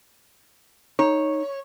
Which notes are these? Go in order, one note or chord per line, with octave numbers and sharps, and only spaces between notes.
D#4 C#5